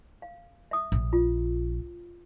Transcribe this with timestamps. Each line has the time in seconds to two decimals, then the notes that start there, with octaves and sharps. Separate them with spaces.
0.22 F5
0.71 E5 D#6
0.92 A#1
1.13 F4